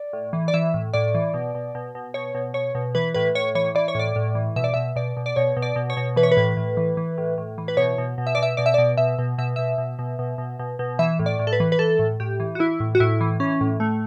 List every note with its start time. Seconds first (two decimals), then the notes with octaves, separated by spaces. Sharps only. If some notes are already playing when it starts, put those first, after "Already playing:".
Already playing: D5
0.13 A2
0.33 E3
0.48 D5
0.54 E3 E5
0.74 A2
0.94 A2 D5
1.15 E3
1.34 B2
1.55 B2
1.75 B2
1.95 B2
2.14 B2 C#5
2.35 B2
2.54 B2 C#5
2.75 B2
2.95 E3 B4
3.14 A2 B4
3.35 A2 C#5
3.55 E3 C#5
3.75 E3 D5
3.88 C#5
3.95 A2 D5
4.16 A2
4.35 E3
4.56 B2 E5
4.64 D5
4.74 B2 E5
4.96 B2 D5
5.17 B2
5.26 D5
5.36 B2 C#5
5.57 B2
5.62 D5
5.76 B2
5.90 C#5
5.97 B2
6.16 E3 B4
6.23 C#5
6.31 B4
6.37 A2
6.57 A2
6.77 E3
6.97 E3
7.18 A2
7.38 A2
7.58 E3
7.68 B4
7.77 B2 C#5
7.98 B2
8.18 B2
8.27 E5
8.35 B2 D5
8.43 E5
8.57 B2 D5
8.66 E5
8.74 B2 D5
8.97 B2 E5
9.19 B2
9.38 B2 E5
9.56 B2 E5
9.78 B2
9.99 B2
10.19 B2
10.38 B2
10.59 B2
10.79 B2
10.99 E3 E5
11.19 A2
11.26 D5
11.39 A2
11.47 A4
11.53 B4
11.60 E3
11.72 B4
11.79 E3 A4
11.99 A2
12.20 A2 G4
12.40 E3
12.55 F#4
12.59 E3 E4
12.80 A2
12.95 F#4
13.00 A2 E4
13.21 E3
13.40 E3 C#4
13.61 A2
13.80 A2 A3